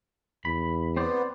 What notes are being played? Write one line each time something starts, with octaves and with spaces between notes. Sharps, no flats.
E2 B5
B3 C4 C5 D5